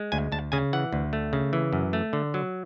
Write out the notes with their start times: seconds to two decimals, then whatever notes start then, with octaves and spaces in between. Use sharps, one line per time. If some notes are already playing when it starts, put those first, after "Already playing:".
Already playing: G#3
0.12 D2 G#5
0.32 D2 A5
0.52 C#3 G#5
0.73 E3 F#5
0.93 D2
1.13 A3
1.33 C#3
1.53 E3
1.73 F#2
1.93 A3
2.13 D3
2.34 F#3